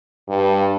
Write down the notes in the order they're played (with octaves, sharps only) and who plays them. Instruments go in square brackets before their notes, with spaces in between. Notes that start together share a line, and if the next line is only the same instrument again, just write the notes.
[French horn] G2